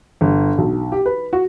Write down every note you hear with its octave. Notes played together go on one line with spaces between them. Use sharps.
G1
B1
G4
B4
F#4